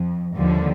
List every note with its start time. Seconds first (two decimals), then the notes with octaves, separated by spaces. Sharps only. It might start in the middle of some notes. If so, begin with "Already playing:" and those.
Already playing: F2
0.36 D#2 D3 F3 G3